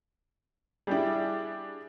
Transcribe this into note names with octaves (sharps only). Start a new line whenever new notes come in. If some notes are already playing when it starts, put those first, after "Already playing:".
G3 D4 E4 G4 G#4